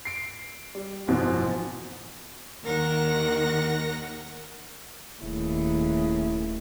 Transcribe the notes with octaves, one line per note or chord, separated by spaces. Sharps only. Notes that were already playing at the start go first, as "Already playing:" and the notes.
C7 D7
G3
F#1 G#2 B2 E3 F3
D#2 D#3 A#4 F#5 A#6
D#1 D#2 C#3 A3 E4